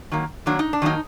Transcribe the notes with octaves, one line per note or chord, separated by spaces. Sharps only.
D#3 F#3 A#3
D#3 F#3 A#3 D4
D#4
D4
D#3 F#3 A#3 D#4